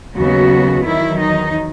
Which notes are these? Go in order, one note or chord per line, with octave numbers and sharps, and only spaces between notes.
D#2 C#3 F#3 B3 F#4
E2 D#3 F#3 E4
D#4